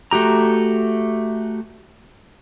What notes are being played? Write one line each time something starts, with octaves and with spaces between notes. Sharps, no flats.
A3 F#4 G4 A#5